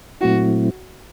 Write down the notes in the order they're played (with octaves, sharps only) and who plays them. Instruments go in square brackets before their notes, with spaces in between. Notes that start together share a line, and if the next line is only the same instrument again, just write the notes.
[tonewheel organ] A#2 F#3 A3 C4 E4 [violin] F#4